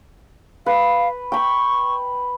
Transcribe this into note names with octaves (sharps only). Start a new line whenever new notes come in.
B4 F5
G5 B5 C#6